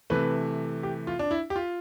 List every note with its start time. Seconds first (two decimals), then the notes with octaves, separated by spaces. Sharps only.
0.10 C3 E3 A3 B4
0.83 G4
1.07 F4
1.19 D4
1.31 E4
1.50 G4
1.56 F4